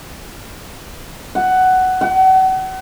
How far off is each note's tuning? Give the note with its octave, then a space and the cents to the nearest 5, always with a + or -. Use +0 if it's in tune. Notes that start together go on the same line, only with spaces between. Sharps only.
F#5 +10
F#5 +35